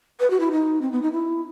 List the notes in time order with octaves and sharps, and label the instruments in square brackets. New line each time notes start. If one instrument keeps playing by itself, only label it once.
[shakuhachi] B4
F#4
E4
D#4
C4
B3
D#4
E4